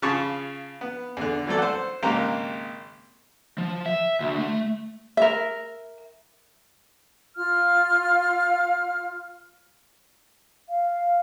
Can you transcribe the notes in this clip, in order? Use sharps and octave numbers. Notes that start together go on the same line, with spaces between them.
C#3 F4 G#4 A5 B5 C#6
B3
E2 D3
E3 F#3 A3 C4 A4 D5
C5 F#5
G#1 G#2 C#3 A#3 G4 A#5
F3
E5
D2
A3
A#4 E5
F4 F5 F6
F5